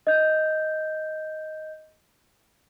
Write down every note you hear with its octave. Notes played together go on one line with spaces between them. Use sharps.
D#5 G6